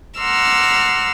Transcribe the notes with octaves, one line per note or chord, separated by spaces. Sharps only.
F#5 A#5 C6 D6 E6 F6